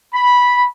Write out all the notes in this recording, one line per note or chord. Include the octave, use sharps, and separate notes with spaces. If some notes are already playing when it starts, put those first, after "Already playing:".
B5